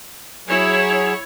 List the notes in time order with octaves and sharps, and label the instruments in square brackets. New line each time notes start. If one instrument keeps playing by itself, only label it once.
[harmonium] F#3 G#4 [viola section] E4 C#5